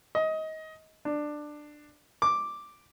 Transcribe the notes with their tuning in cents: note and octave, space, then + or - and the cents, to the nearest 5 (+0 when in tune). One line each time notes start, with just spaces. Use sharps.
D#5 +20
D4 +15
D6 +0